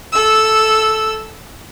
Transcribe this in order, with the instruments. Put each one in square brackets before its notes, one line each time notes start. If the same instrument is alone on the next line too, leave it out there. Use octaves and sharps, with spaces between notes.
[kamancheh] A4 E6